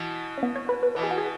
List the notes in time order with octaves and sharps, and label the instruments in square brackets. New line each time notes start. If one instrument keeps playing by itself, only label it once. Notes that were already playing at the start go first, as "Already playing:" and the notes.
Already playing: [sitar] B2 E3
[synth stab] C#4
B3
C#5
B4
B4
[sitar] B2 E3 [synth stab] B4
[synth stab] G#4
F#4
G#4